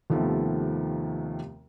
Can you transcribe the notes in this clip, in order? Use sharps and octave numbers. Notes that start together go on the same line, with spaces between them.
D#2 C3 D#3 F3 A3 B3